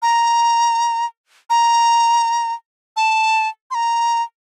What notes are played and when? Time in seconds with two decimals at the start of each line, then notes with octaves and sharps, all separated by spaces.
0.02 A#5
1.50 A#5
2.96 A5
3.71 C6
3.74 A#5